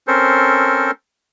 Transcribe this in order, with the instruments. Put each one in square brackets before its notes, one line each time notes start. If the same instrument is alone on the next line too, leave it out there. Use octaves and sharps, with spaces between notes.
[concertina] C4 C#4 A4 A#4 C5